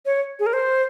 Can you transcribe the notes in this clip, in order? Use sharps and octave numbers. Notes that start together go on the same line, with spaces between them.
C#5
G#4
A#4
C5